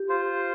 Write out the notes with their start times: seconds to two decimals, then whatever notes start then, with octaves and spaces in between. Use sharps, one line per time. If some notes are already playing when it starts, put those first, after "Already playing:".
Already playing: G4
0.09 F4 C5